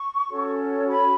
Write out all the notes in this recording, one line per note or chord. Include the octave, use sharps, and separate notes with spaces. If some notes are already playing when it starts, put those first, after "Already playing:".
Already playing: C#6
C#4 F#4 A4 C#5
B5